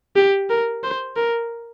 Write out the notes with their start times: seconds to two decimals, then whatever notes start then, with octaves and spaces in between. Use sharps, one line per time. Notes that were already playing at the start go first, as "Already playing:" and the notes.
0.16 G4
0.50 A#4
0.83 C5
1.16 A#4